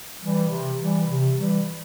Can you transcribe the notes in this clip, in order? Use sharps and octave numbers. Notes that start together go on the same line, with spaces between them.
E3 G3
C3
E3 G3
C3
E3 G3